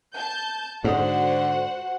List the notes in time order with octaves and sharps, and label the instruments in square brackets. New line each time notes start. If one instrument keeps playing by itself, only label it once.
[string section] A5 G6
[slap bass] G#2 [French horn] D3 [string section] F#4 C5 F#5